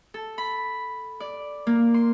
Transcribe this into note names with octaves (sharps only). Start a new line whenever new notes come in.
A4
B5
D5
A#3
C6